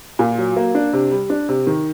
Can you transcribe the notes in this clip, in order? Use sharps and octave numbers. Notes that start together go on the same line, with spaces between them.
A#2
F#3
A#3
D4
C3
G3
D4
C3
D#3